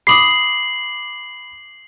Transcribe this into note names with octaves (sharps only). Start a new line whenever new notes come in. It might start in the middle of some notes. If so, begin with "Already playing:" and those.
B5 D6 D#6 C7 F#7